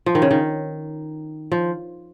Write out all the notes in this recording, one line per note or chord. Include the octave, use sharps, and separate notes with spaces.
F3
D#3
C#3
D#3
F3